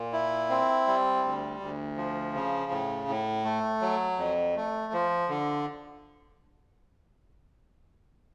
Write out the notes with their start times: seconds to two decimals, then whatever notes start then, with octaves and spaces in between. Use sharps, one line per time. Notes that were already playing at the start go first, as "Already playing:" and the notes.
Already playing: A#2
0.13 E4
0.50 C4
0.87 G3
1.24 D2
1.60 D2
1.97 F3
2.35 C#3
2.71 A2
3.08 A2
3.45 A3
3.82 F#3
4.18 F2
4.56 A3
4.93 F3
5.29 D3